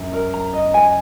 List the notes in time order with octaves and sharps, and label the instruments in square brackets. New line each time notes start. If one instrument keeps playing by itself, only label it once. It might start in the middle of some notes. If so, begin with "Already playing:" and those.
Already playing: [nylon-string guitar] F#2
[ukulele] A#4
A#5
D#5
G#5